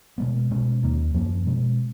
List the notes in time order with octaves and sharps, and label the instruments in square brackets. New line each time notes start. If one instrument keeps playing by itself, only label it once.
[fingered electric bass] B2 G#3 B3
B2 G#3 C#4
D#2 D#3 A#3
F#2 F3 A#3 C#4
B2 G#3 C#4